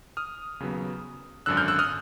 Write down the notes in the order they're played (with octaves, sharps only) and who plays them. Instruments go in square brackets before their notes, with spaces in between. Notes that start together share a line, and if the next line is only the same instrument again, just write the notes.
[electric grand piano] D#6 F6
D#2 C#3 F#3 B3
G#1 F#2 D3 E6 F#6
F6 G6
E6 F#6
D#6 F6